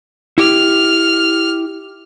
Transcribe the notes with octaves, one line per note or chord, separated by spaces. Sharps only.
E4 G4 F6